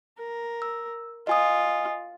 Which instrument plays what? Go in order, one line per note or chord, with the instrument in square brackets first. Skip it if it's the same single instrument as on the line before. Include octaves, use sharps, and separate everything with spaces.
[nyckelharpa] A#4
[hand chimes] E6
[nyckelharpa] F4 [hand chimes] D#5 G#5 D#6